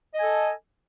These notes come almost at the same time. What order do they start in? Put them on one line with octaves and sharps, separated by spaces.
D#5 G#5 A4